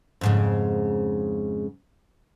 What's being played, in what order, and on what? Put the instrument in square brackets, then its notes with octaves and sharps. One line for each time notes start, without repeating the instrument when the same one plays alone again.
[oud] F2 G#2 C#3